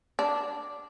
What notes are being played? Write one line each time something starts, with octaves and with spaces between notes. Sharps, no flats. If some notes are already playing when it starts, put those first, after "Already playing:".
D4